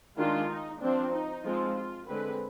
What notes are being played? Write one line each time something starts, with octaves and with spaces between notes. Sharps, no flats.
D#3 G#3 D4 F4
D#4
F3 C4 D4
D#4
F3 G#3 C4 F4
F4
D3 G#3 C4 B4